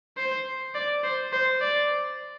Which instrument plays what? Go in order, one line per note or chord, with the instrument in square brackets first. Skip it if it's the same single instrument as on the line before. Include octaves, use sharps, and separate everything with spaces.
[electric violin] C5
D5
C5
C5
D5